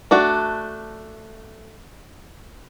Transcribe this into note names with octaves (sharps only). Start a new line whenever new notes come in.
A3 D4 F#4